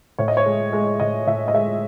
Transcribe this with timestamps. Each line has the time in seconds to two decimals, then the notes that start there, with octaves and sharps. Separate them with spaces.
0.18 A2 C#5
0.28 D#5
0.37 C#5
0.46 G#3
0.73 G#3
1.00 A2 D#5
1.27 A2 E5
1.48 D#5
1.54 G#3 E5